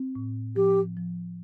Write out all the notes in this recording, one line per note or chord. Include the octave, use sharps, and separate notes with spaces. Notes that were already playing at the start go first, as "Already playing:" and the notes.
Already playing: C4
A2
F3 G4
F3